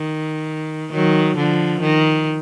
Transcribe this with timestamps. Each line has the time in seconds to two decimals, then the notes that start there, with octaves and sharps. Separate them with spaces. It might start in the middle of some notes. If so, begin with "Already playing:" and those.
Already playing: D#3
0.92 D#3 F#3
1.37 D3 F3
1.81 D#3